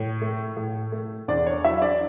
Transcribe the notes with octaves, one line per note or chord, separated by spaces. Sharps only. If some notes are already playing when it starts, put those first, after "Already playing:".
Already playing: A2 C#5
A3
A2
A3
E2 D4 D5
C#5
F#3 E4 E5
D4 D5